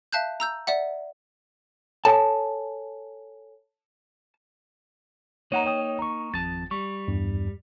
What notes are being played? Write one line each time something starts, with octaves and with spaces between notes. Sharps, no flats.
E5 F5 A5 F#6 G6
A#5 E6 G6
D5 E5 F#5
A4 C#5 G#5 A5
A#3 D#4 C#5 F#5 A#5
C#5 G5 D#6
A#5 C#6
G#1 F2 A5 A6
G3 C#6
E2 G2